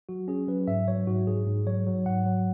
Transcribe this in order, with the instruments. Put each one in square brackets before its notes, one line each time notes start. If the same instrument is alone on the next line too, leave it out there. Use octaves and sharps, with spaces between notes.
[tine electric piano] F#3 F#4
C#4 G#4
F#3 B4
G#2 E5
F#3 C#5
G#2 F#4
G#2 G#4
G#2
F#3 C#5
F#3
G#2 F#5
F#3